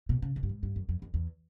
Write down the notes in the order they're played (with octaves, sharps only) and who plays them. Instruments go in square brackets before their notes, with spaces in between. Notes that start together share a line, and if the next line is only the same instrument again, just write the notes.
[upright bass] B2
C#3
B2
G2
G#2
G2
F#2
F2
F2
E2